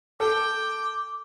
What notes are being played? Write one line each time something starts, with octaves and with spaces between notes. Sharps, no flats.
A4 G5 D6